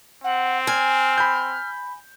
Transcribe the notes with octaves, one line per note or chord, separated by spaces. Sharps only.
C4 F#5
G#5 F6
B5 G6